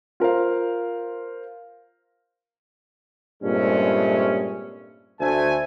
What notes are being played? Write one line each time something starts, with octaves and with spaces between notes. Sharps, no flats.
F4 A#4 C5 F5
G2 A#2 G#3 A3 C4 C#4
D2 A3 C5 G#5